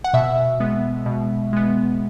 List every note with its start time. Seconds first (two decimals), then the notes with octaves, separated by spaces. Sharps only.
0.04 F#5
0.14 B2 E5
0.60 G#3 B3
1.06 B2
1.53 G#3 B3